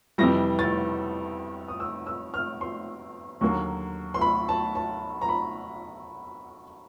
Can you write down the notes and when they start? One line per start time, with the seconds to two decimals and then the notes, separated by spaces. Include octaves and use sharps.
0.18 F2 C3 E3 G3 A#6
0.59 A6
1.68 D#6
1.80 E6
2.07 E6
2.34 F6
2.61 C6
3.41 D#2 D3 F#3 A#3
4.14 C6
4.21 B5
4.49 A5
4.75 A5
5.22 A#5
5.29 B5